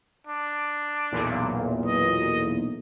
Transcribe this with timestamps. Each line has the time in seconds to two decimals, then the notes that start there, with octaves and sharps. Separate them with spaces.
0.27 D4
1.12 B1 E2 A#2
1.86 D#5